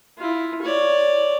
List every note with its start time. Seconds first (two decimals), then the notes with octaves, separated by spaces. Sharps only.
0.18 E4 F4
0.62 C#5 D5